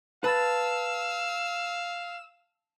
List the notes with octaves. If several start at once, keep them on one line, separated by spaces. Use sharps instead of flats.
B4 F5 A5 E6 A6